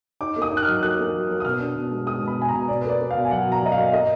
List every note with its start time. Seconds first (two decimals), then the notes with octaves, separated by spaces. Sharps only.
0.21 D#4 D6
0.36 A#3
0.42 D#6
0.52 D#4
0.57 F#6
0.63 F#3 F6
0.82 A#3 F#6
0.99 A#3
1.14 F#3
1.29 A#3
1.40 D#6
1.45 B2 F6
1.60 D4
1.76 B2
1.92 G#3
2.07 G#3 D#6
2.22 B2
2.28 B5
2.38 B2 G#5
2.49 B2 A#5
2.68 B2 D5
2.82 B4
2.85 A#3 D5
3.00 A#3
3.11 B2 F5
3.25 G#5
3.31 F#3 F#5
3.46 B2
3.52 A#5
3.62 F#3 D#5
3.72 F5
3.77 A#3
3.92 A#3 D#5